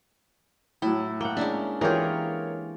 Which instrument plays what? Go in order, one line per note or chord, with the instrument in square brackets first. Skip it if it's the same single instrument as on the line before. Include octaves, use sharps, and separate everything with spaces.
[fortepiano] A2 F#3 [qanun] E4
[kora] A#3 F#5 [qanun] G5
[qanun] G#3 C#4 D4 [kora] E5
[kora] E3 G4 [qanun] F4 G#4 [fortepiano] A#4 C#5